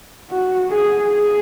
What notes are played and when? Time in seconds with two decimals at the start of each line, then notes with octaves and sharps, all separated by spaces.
0.31 F#4
0.70 G#4
1.09 G#4